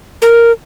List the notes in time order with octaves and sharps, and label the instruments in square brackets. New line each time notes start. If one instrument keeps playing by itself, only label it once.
[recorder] A#4